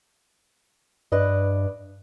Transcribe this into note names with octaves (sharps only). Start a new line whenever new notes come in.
G2 B4 D5 D#5